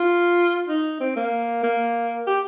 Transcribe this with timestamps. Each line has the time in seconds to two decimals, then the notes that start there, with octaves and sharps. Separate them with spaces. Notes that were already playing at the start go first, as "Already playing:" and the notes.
Already playing: F4
0.69 D#4
1.00 C4
1.16 A#3
1.63 A#3
2.27 G4